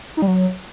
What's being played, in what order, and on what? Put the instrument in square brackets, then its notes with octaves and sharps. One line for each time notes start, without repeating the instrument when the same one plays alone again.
[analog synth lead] D#4
G3
F#3